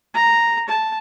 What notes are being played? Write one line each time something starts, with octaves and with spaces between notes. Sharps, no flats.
A#5
A5